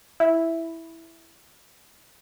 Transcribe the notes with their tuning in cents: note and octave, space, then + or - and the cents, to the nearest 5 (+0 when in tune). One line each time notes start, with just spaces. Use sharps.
E4 +0